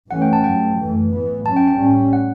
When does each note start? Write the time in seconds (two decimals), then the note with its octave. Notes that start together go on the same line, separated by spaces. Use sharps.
0.10 G2 E3 A3 C#4 F#5
0.22 G5
0.33 A5
0.44 G2 F#3 A3 G5
0.78 F#2 E3 A3
1.11 A2 E3 B3
1.46 G2 F#3 C#4 A5
1.56 G5
1.68 G5
1.79 A2 G3 C#4
2.13 F#5